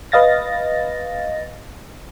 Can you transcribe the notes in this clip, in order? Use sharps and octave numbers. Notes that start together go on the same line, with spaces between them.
B4 D#5 F5 A6 A#6